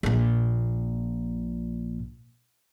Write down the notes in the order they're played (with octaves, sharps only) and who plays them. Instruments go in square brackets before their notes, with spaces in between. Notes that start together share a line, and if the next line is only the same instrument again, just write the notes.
[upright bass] A#1 A#2